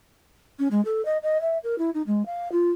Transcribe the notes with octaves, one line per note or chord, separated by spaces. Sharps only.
C#4
G#3
A4
D#5
D#5
E5
A#4
E4
D#4
G#3
F5
F4